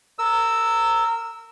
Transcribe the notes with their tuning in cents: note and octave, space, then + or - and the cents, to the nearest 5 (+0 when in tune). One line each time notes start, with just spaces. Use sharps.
A#4 -25 E6 +0